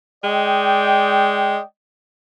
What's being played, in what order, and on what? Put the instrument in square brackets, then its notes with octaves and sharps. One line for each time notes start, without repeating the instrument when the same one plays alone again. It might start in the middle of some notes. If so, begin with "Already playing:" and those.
[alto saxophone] G#3 [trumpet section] D5 D#5 G5